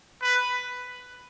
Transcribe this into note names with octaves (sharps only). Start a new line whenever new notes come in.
B4